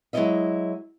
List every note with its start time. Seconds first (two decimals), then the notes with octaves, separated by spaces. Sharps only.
0.13 F#3 G#3 D#4 E4 D#5 E5